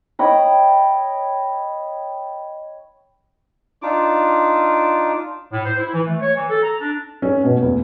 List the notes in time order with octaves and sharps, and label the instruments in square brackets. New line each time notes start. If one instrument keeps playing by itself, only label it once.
[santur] C#5 D#5 G5 B5
[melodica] D4 D#4 F4 D6
[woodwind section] A2
C5
E4
E3
A3
C#5
E3
A4
A#5
D4
[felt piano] C#4
B2
E2